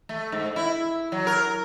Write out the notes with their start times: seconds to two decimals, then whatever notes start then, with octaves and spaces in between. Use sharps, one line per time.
0.09 A3
0.32 G#2
0.56 E4
1.12 F#3
1.27 A#4